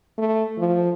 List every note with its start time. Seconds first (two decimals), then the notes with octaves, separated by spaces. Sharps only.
0.18 A3
0.59 F3